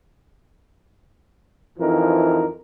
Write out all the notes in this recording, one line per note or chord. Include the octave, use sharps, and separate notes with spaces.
F2 E3 F3 D#4 A#4